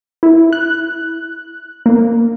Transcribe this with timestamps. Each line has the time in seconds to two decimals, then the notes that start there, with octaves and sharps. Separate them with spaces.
0.23 E4
0.53 F#6
1.86 A#3